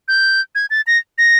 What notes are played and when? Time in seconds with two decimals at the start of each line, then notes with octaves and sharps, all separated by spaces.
0.08 G6
0.55 G#6
0.70 A6
0.87 A#6
1.18 A#6